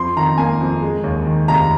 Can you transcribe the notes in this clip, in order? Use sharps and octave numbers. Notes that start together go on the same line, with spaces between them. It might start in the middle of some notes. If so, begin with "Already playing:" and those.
Already playing: F2 C6
D#3 A#5
A#3 G#5
F2
G#3
D#2
D#3
F1 A#5